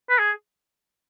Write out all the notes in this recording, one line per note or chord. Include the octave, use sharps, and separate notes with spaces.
B4
G#4